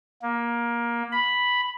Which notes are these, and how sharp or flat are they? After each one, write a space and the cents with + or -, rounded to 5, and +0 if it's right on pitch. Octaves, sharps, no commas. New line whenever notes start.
A#3 +20
B5 +0